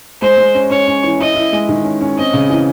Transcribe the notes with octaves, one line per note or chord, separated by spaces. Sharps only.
G#3 C5
G#3
C#4
C#4 C#5
C#4
E3
E4 D#5
E4
G#3
D#3
C#4
C#4
C4 D#5
C#3
E3